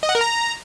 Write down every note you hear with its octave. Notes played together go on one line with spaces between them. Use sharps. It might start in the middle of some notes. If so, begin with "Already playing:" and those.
D#5
F#5
A#4
A#5